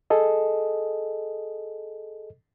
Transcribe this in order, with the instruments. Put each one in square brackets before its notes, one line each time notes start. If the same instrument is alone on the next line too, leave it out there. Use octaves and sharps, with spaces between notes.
[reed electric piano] G#4 A4 D#5